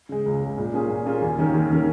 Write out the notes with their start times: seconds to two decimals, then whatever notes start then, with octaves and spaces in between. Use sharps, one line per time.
0.09 C#3 G#3
0.26 C#2
0.42 C#3 G#3
0.57 A#2
0.74 A#3 C#4 F4 G#4
0.90 A#2
1.06 A#3 C#4 F4 G#4
1.22 D#2
1.38 D#3 C#4 A#4
1.54 D#2
1.70 D#3 C#4 A#4